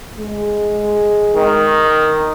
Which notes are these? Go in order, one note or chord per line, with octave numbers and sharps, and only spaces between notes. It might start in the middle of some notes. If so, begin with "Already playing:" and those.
G#3
D#3